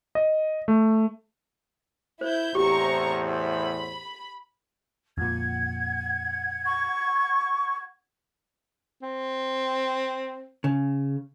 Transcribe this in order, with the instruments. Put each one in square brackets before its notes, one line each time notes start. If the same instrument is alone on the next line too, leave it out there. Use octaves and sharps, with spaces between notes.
[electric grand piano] D#5
A3
[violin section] E4 G6 [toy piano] C5
[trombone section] E2 A2 C5 [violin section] C4 A#5 C#6 [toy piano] G4
[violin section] B5
[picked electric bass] F2 A#2 [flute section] F#5 G#6
[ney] C#6
[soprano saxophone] C4
[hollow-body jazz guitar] C#3